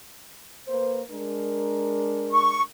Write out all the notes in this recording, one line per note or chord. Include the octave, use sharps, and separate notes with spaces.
A#3 B4 C5
G#3 D4 A#4
C#6